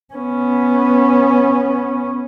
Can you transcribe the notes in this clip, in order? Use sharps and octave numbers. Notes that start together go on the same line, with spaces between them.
B3 C#4